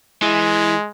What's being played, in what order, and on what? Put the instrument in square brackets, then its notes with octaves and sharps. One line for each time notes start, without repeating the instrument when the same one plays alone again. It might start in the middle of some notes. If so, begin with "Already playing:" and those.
[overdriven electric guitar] E3 [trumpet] G#3